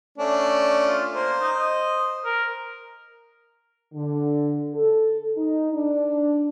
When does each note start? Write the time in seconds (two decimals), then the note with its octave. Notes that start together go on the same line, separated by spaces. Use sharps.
0.18 A3 C#4 D4
0.88 F4
1.14 A#3 C5
1.41 D#4
1.58 D#5
2.25 A#4
3.94 D3
4.75 A4
5.37 D#4
5.73 D4